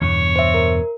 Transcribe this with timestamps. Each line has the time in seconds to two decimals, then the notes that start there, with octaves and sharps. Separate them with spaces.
0.01 E2 G2 B2 C#5
0.36 C5 E5
0.54 A#4